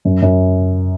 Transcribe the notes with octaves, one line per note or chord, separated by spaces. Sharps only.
F#2
F#2